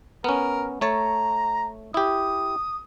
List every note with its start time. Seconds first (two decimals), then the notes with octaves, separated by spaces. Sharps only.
0.24 B3 C#4 A#4
0.81 A3 C#5 A5 A#5
1.94 E4 G4 D#6